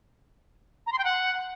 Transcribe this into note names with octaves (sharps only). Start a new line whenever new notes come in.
A#5
C6
G5
F#5